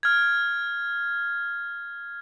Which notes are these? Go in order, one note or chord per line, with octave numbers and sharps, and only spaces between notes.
F6 G#6